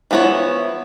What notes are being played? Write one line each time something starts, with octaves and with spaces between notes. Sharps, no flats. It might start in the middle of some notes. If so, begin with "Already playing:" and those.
E3 F3 B3 E4 C#5